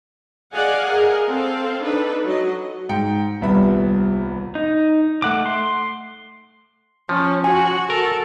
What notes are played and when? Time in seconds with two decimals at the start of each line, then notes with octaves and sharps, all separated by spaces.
0.52 G#4 D5 D#5 F5 F#5 G#5
0.89 G#4 A#4 D#5
1.28 C4 A4 F5
1.82 D4 D#4 A4 B4
2.26 F#3 D#5
2.89 G#2 G5 C#7
3.41 D#1 C2 B3 E5 B5
4.55 D#4
5.22 A3 F#5 D6
5.46 C6
7.09 F3 C#4
7.44 F#4 G#5
7.90 A4 A#4